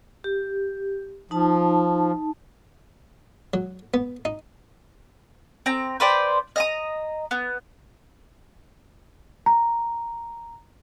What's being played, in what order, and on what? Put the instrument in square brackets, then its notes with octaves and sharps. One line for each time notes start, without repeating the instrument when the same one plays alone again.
[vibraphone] G4
[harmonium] F3 [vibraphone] D#4 A5
[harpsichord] F#3
B3
D#4
[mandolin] C4 A#5
B4 C5 D5 G5
D#5 A#5 D#6
B3
[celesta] A#5